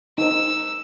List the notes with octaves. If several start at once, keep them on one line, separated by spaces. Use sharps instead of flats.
D#4 C5 E6